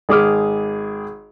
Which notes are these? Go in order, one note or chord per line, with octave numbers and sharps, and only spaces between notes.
G#1 G#4 D6 F6